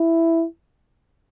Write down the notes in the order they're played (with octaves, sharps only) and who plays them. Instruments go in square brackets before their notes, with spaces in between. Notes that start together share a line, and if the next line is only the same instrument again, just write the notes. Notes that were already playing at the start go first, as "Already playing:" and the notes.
Already playing: [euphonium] E4